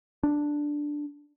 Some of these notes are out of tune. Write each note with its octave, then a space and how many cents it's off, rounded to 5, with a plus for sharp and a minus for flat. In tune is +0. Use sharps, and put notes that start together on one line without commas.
D4 +0